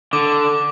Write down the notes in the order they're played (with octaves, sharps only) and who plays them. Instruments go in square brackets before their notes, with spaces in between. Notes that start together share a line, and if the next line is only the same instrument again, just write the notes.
[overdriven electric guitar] D3 [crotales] D6